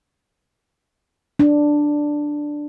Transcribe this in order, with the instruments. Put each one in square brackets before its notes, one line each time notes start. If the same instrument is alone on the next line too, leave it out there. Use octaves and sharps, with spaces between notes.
[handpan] D4